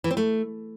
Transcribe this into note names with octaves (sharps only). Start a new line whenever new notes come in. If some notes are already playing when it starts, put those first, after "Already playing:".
E3
C4
A3